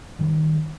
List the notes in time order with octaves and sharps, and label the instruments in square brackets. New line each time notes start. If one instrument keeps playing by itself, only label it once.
[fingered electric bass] D#3 G3